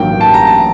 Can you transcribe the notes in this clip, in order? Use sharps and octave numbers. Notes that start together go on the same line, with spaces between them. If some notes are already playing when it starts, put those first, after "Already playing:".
Already playing: A1 G2 D#3 F#3 A#3 G5
A5
A#5
A5